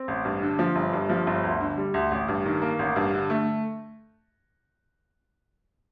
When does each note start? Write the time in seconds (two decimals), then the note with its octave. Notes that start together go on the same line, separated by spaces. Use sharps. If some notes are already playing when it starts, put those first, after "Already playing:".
Already playing: C4
0.08 A1
0.25 G2
0.42 D3
0.59 F3
0.76 G1
0.93 G2
1.09 F3
1.27 G1
1.44 D2
1.61 D3
1.77 G3
1.94 D2
2.12 A1
2.28 G2
2.45 D#3
2.62 A#3
2.79 A1
2.96 G2
3.13 D3
3.30 A3